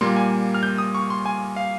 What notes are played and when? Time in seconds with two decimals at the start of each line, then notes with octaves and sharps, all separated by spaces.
0.01 A#2 G3 A#3 C6
0.16 G#5
0.54 F6
0.63 G6
0.78 D#6
0.95 C#6
1.10 C6
1.26 G#5
1.56 F5